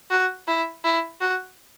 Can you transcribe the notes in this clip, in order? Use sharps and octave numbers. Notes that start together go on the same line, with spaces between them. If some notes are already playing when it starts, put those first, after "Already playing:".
F#4
E4
E4
F#4